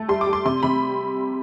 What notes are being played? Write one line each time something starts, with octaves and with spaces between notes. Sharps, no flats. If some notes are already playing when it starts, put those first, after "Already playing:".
Already playing: A3
G3 C6
D6
G3
C6
C3 C6
C3 B5